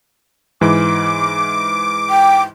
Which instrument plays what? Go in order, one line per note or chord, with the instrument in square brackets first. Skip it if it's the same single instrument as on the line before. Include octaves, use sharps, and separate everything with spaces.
[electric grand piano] G#2 E3 [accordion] D6
[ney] G5